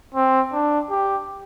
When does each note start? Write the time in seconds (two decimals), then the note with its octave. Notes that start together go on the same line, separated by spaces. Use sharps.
0.15 C4
0.53 D4
0.90 G4